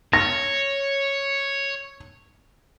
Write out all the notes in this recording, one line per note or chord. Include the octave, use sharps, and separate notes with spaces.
C#5 A#6